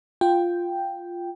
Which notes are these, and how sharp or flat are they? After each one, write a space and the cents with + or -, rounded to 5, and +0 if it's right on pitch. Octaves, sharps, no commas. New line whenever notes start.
F4 +0 G5 +0